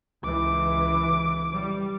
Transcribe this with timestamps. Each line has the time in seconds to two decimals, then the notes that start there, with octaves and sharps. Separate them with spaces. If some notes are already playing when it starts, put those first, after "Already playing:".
0.24 C#2 E3 D6
1.55 G3